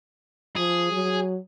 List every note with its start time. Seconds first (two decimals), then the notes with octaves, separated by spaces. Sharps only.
0.57 F3 G#4
0.92 F#3